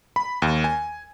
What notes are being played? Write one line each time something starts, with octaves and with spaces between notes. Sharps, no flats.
B5
D#2
G#5